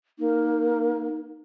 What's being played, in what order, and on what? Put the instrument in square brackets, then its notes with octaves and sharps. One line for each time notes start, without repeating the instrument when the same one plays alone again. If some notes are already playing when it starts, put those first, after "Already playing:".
[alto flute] A#3 [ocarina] D#4